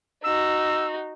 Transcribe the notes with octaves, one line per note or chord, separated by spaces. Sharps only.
D#4 F#4 E6